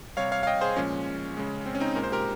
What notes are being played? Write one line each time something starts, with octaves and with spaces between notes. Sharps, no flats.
C3 G3 C#5 F5
C#5 F5
F5
D#5 G5
G#4 C5
A#2 F3 G#3 C#4
C#3 G#3
C4
C#4
C4 D#4
A#2 G#3 A#4
C5
G4 A#4